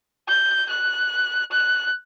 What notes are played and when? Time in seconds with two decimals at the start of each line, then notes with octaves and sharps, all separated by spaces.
0.28 G6
0.69 F#6
1.52 F#6